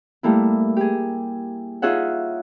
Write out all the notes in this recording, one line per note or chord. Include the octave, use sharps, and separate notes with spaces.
G3 A3 A#3 E4
G4 G#4
D#4 F4 G#4 C#5 E5 F#5